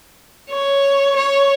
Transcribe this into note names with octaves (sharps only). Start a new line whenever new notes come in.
C#5
C#5